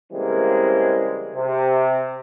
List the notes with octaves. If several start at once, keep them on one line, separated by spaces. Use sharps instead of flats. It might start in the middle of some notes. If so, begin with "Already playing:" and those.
C#3 E3 G3 G#3 A#3 C4
C3